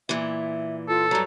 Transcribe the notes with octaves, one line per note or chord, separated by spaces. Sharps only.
A#2 E3 E5
F4 A4
G2 F#3 A#5